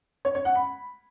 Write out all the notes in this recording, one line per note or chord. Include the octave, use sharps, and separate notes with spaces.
C#5
C#5
F#5
B5